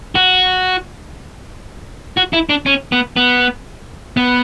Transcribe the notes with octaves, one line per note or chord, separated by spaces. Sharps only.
F#4
F#4
E4
D4
C#4
B3
B3
B3